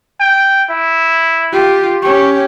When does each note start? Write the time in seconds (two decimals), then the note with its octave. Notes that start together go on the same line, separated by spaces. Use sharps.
0.20 G5
0.70 E4
1.53 F4 G4
2.02 C#4 G4 C#6